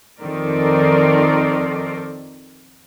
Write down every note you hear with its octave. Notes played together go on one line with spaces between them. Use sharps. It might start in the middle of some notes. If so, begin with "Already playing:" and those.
F2 D#3 A4 A#4 C5 D5